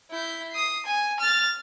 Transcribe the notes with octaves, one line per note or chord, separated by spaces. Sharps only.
E4 G6
D#6 C7
G#5
F6 A6